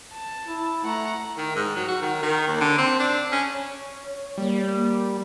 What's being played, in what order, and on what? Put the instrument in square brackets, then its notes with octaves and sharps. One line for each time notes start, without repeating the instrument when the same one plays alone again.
[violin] A5
[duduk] E4
[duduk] A3 [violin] F#5 A#5
[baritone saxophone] D#3
G#2
F#3
F#4
D#3
D#3
D#2
D3
C4
D4
C#4
[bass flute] C#5
[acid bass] G3 [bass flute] A#3
[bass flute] A#3